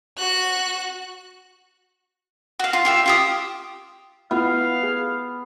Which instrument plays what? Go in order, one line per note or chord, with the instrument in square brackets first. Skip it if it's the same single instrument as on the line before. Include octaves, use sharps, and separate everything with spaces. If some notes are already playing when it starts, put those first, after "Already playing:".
[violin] F#4 F#6
[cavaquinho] F#4 F5
F4
F4 G4 E5
F4 G4 D#6
[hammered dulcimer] B3 [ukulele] E4 F4 [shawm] F5
[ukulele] G#4